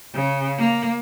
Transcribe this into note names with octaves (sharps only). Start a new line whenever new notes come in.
C#3
A#3